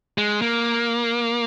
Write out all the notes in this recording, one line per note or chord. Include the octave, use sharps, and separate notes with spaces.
G#3
A#3